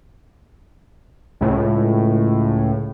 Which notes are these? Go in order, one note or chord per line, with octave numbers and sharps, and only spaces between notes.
C#2 A2